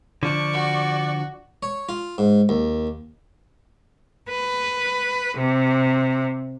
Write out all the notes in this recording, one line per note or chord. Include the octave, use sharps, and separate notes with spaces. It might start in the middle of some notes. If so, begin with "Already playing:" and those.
D3 F3 D4 D5 C#6
F#4
C#5
F4
G#2
D#2
B4
C3